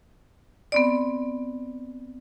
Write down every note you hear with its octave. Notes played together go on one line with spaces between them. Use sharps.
B3 C4 D5